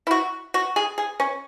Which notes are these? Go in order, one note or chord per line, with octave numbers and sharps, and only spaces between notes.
E4
F#4
F#4
G#4
G#4
C#4